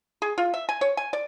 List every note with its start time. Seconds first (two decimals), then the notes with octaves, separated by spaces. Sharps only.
0.22 G#4
0.38 F4
0.54 E5
0.69 G#5
0.81 C#5
0.97 G#5
1.13 D5